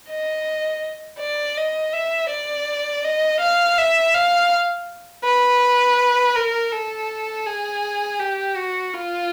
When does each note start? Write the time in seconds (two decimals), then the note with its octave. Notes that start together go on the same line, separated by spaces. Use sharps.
0.09 D#5
1.19 D5
1.57 D#5
1.93 E5
2.30 D5
3.04 D#5
3.40 F5
3.78 E5
4.14 F5
5.24 B4
6.35 A#4
6.72 A4
7.46 G#4
8.19 G4
8.56 F#4
8.94 F4